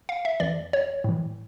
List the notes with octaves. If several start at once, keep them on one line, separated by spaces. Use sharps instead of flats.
F5
E5
F2 E3 D5
C#5
A2 E3